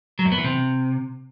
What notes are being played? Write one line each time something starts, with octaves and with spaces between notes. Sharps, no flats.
F#3
F#2
B3
E3
C3